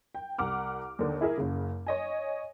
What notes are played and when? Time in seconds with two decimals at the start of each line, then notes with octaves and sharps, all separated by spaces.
0.15 G5
0.38 C2 F#5 D6 F6
0.99 D#2 D3
1.21 E4 G#4 A#4 E5
1.37 F#1 C#3
1.87 C#5 D#5 G#5